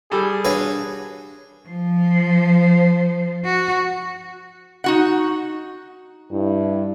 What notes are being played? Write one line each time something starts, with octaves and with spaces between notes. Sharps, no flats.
G3 G#4 A4
D4 F#4 B4 C#5
F3 C5
F#4
D#4 F#4 F#5
G2 E4